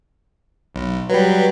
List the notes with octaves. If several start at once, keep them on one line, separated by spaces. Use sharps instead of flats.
B1
F#3 G3 B4